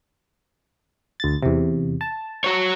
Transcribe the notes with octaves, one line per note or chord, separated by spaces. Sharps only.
D2 A6
E2 C3
A5
F#4 C#5